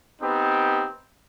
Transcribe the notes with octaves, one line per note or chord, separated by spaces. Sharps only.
B3 C4 D#4 G4